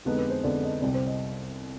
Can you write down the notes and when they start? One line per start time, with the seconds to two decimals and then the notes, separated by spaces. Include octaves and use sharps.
0.05 F2 D3 G#3 B3 D#4 G4
0.18 B4
0.30 C5
0.44 F2 D3 G#3 B3 D#4 D5
0.63 D#5
0.81 C2 C3 G3 D5
0.94 C5
1.07 D#5